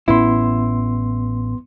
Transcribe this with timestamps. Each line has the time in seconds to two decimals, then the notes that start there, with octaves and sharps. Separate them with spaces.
0.08 A1 A2 B3 C#4 E4 C6